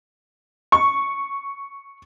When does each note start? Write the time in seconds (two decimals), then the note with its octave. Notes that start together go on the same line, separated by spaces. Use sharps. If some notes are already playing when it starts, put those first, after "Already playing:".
0.72 C#6